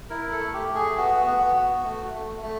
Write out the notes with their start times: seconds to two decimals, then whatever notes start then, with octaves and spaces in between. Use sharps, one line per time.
0.10 E4 A#4
0.32 A4
0.39 A3
0.54 G4
0.69 A3
0.75 G#4
0.97 B3 F#4
1.26 B3
1.56 F#4
1.84 A3
2.14 A3
2.42 A3